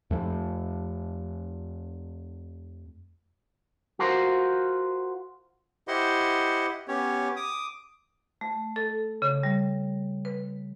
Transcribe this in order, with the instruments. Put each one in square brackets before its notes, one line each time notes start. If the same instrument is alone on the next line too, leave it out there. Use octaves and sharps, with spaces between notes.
[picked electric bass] F2 A3
[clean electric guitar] F4 F#4 A#4 C5
[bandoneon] E4 G4 C5 D#5 F#5 C6
B3 C#4 G4 C#5
D6 D#6
[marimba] A3
A4
C#3
G3
B4